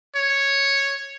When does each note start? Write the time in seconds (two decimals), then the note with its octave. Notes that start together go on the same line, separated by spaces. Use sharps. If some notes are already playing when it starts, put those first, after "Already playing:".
0.16 C#5